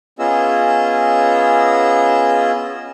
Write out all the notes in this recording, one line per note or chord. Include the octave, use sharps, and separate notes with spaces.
B3 C#4 F4 G#4 D#5 E6